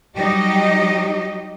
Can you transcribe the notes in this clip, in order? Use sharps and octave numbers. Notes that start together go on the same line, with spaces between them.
F#3 G3 D#4 G4 D#5